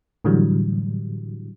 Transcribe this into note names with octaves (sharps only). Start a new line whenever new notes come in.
A2 D3 E3 F#3 G3